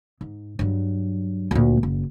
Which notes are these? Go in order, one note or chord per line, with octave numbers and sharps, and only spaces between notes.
G#2
G2 F#3
D2 A#2
F#1